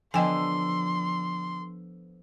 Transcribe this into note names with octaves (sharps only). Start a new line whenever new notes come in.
D3 F3 B3 D#5 G5 G#5 C6